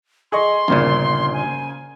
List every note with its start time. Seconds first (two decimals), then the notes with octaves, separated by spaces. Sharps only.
0.32 G#4 D#5 C6 C#6
0.68 G1 D#2 A#2 C#3 A#3 C5
1.33 G#5